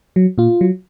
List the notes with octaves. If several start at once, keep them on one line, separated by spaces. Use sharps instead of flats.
F#3
A#2 F4
F#3